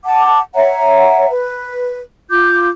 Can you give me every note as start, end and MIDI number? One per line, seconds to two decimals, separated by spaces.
0.05 0.39 78
0.05 0.39 81
0.05 0.39 86
0.54 1.28 73
0.54 1.28 76
0.54 1.28 78
0.54 1.28 82
1.30 2.01 71
2.30 2.69 65
2.30 2.69 86
2.30 2.69 91